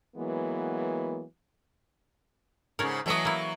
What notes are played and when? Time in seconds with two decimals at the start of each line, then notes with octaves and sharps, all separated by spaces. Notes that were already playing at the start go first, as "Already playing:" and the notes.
0.16 E3 F#3 G#3 A#3 B3
2.79 G#2 C#3 A#4 C#5 D5
3.06 E3 F#3 A3 D#5 E5
3.25 A#3 E4